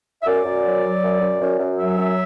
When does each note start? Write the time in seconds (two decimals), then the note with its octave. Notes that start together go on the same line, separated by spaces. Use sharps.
0.23 E5
0.27 F#2 D5
0.45 F#2
0.64 F#3
0.83 F#3
1.03 F#2
1.21 F#2
1.41 F#2
1.59 F#2
1.78 F#3 E5
1.98 F#2